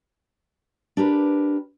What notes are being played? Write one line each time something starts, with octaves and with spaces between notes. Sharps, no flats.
D4 G4 A#4 B4